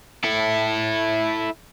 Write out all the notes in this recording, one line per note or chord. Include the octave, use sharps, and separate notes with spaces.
E4 A4